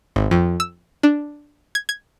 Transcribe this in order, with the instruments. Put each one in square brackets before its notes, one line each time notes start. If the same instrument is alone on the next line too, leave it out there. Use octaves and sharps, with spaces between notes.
[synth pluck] G#1
F2
E6
D4
G#6
G#6